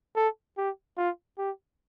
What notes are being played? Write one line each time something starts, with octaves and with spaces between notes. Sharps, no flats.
A4
G4
F4
G4